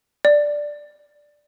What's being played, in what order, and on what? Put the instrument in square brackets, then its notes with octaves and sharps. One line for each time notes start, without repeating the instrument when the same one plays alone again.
[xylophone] D5